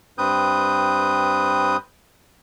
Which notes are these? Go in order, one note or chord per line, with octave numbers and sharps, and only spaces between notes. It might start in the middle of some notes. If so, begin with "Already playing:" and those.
G2 C4 B4 D#6 G6